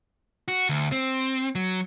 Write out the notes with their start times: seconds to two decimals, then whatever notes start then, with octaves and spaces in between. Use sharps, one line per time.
0.48 F#4
0.69 D2
0.92 C4
1.55 F#3